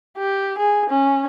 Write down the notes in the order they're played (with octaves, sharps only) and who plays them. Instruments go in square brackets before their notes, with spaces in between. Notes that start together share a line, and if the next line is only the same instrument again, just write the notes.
[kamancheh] G4
G#4
C#4